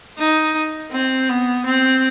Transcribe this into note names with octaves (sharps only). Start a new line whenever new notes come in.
D#4
C4
B3
C4